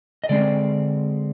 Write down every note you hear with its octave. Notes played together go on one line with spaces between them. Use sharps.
D#5
D3 G#3 C4 D5